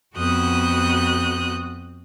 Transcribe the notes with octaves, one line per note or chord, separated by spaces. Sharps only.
F2 B3 F#4 D#6 F#6 G6